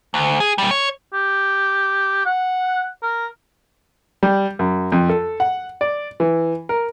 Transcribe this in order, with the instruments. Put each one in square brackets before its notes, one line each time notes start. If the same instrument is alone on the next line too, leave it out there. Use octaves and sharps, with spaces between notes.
[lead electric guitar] D2
G#4
A#2 G3
C#5
[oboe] G4
F#5
A#4
[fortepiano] G3
F#2
F2
A4
F#5
D5
E3
A#4